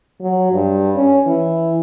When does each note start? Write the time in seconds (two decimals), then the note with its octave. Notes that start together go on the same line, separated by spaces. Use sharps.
0.21 F#3
0.52 G2
0.95 C#4
1.26 E3